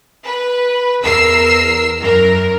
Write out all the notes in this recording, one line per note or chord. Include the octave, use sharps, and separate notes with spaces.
B4
E2 A#4 E6 C7
F#2 A#4